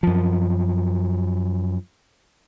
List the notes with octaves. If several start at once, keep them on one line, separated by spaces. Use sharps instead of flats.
F#2 F3